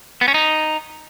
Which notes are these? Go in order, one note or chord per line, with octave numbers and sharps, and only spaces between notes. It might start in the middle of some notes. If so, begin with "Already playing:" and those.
B3
C#4
D#4